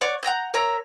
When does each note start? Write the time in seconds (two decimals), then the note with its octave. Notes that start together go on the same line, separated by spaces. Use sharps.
0.01 C#5 D5 F#5 C#6
0.23 F#5 G5 A#5 G6
0.54 A#4 C#5 E5 A#5